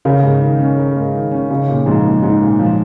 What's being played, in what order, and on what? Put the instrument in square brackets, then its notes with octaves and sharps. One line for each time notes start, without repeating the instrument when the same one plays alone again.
[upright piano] C#3 [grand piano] A#4
[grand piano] G#2
D#3
C#4
A#4
G#2
D#3
C#4
[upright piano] C#3 [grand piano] D#4
[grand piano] A#2
[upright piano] G#2 [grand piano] F3
[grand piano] A#3
[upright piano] G#2 [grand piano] D#4
[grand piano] A#2
F3